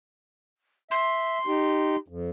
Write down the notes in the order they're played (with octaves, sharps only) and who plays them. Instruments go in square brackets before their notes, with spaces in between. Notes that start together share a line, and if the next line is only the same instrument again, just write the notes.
[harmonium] E5 [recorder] C6
[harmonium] D#4 G4
F2